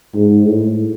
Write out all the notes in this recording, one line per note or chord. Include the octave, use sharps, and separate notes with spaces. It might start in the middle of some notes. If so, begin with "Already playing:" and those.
G#2
A2